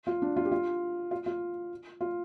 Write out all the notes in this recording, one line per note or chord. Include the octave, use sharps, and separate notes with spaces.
F4
D4
F4
G4
F4
F4
F4
F4